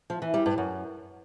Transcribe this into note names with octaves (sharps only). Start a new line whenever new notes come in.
F3
E3
G3
G2
F#2